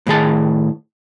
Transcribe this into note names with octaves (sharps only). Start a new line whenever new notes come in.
A2 D#3 G#4 A5